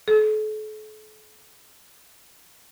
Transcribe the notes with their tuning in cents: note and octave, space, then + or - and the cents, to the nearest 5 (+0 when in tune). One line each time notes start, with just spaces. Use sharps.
A4 -40